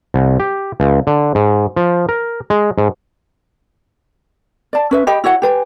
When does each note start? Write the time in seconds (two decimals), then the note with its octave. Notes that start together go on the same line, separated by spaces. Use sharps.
0.14 C2
0.40 G4
0.80 C#2
1.07 D3
1.35 G#2
1.76 F3
2.09 A#4
2.50 G#3
2.78 G#2
4.73 D5 A5
4.91 C#4 B4 E5
5.07 G4 D#5 G5 B5
5.24 E4 F#4 C#5 F#5
5.42 G4 B4 G#5